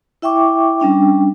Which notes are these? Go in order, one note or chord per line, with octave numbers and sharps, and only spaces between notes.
E4 E5 G5 C#6 D6
G3 C#4 D4 G5